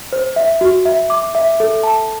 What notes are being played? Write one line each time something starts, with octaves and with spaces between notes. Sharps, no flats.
C5
E5
F#4
E5
D6
E5
A4
A5